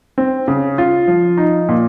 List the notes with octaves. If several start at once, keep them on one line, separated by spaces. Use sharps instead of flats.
C4
C#3
F4
F3
D#4
A#2